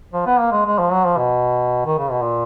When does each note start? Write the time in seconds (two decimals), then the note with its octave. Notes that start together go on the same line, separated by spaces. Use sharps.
0.13 F3
0.27 B3
0.40 A#3
0.52 G#3
0.66 G#3
0.79 F3
0.92 F#3
1.05 F3
1.18 B2
1.86 D#3
1.98 C#3
2.11 B2
2.22 A#2